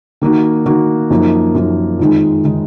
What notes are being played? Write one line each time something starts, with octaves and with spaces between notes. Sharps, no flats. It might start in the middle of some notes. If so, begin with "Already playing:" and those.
D#3 A#3 D#4 F#4
D#3 A#3 D#4 F#4
F#2 F3 A#3 D#4
F#2 F3 A#3 D#4
F2 D#3 G#3 D#4
D#3 G#3 D#4